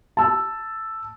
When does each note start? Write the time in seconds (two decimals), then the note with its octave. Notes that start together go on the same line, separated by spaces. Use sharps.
0.17 A5 E6